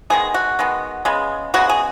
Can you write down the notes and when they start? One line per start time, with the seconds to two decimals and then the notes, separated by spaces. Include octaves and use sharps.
0.10 D#3 G#3 B3 G#4
0.34 F#4
0.59 D#3 G#3 B3
1.05 C#3 G#3 B3
1.54 C#3 G#3 B3 F#4
1.69 G#4